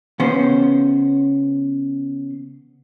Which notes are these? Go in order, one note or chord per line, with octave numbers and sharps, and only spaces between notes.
C#3 B3 C#4 C5